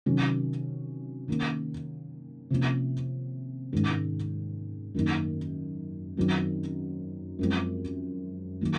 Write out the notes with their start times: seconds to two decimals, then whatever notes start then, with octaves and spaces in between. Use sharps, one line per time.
0.06 C3 D#3 F#3 C#4
1.28 D#3 A#3 C#4
2.50 C3 F3 A#3 C#4
3.73 G#2 D#3 G#3 C#4
4.95 F#2 D#3 A#3 D#4
6.17 F#2 D#3 F#3 C4 D#4
7.39 F#2 F3 G#3 C4
8.61 D#3 F#3 A#3